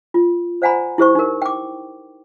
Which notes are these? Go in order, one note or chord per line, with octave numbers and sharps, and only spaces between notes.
F4
C5 D5 F#5 G#5 A#5 B5
E4 G4 C5 C#6
D#4 A#4
G5 D6